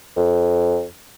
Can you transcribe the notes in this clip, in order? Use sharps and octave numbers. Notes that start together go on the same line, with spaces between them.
F2